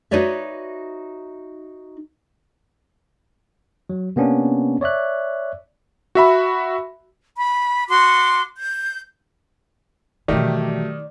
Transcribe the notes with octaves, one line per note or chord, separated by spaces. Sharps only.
D#4 F#4 B4 C#5 D5 E5
F#3
C3 A#3 B3 C#4 D4
C#5 D5 E5 F#6
F#4 E5 B5
B5
F#4 C6 D6
G6
B2 D#3 E3 F#3 A3 G4 D5